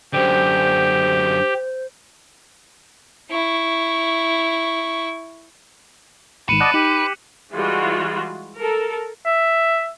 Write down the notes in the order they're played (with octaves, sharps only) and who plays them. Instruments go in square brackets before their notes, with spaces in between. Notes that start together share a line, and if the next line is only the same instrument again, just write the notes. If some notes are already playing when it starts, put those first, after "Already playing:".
[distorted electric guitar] F#2 D3 [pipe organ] G4 [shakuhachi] C5
[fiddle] E4 C#6
[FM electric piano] G#1 G#2 D#3 [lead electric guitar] B4 [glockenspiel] C#7 D#7 E7
[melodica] D5 D#5 A5 [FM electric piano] F#5 [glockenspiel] F#6
[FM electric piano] D#4 [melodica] G4 [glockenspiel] F#7
[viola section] E3 G3 G#3 F4 F#4
A4 A#4
[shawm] E5